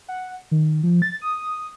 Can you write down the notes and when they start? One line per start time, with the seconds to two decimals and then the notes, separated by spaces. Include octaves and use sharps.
0.08 F#5
0.51 D#3
0.83 F3
1.02 A6
1.21 D#6